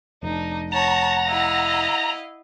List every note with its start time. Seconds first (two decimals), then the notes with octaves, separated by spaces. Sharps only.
0.23 F1 D4 D#4
0.72 C#5 F#5 A5 A#5
1.26 E4 D#5 F5